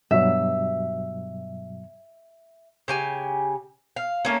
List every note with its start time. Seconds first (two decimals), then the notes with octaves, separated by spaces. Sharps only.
0.11 G2 B2 F#3 E5
2.88 C#3 G4 G#5
3.96 F5
4.25 A3 A#3 C#4